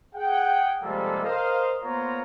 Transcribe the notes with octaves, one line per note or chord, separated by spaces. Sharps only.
G#4 F#5 G5
C3 F3 G3 G#3 A#3 A4
A#4 C5 D#5 F5
A#3 B3 F4 C5 C#5 A#5